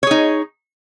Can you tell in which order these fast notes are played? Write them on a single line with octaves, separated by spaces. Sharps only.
C#5 G#4 D#4